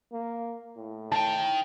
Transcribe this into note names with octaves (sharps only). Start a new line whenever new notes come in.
A#3
A2
D#3 G5 A5